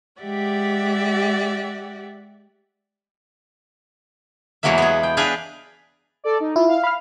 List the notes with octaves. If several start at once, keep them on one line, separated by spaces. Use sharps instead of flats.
G#3 G4 D5 E5 F#5
E2 E3 F#3 G#3 A#3 E5
B3 G#4
G5
D4 G#4 B4 F5 G5 G#5
A4 D5
D#4
E4 F4
F5
B5 F6